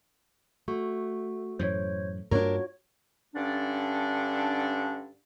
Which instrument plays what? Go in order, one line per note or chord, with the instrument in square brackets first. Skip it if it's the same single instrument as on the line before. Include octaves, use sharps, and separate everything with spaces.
[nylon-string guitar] A3 [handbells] F#4
[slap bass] F#2 A2 E3 [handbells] C5 C#5
[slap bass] G2 A#3 [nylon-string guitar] D4 A#4 [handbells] F4 F#4 C#5
[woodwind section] G2 D3 C#4 D4